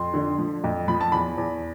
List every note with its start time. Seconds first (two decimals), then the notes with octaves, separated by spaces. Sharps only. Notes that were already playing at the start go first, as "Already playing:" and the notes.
Already playing: F2 C6
0.14 D3
0.38 F3
0.64 F2
0.88 F3 B5
1.01 A5
1.12 E2 B5
1.38 E2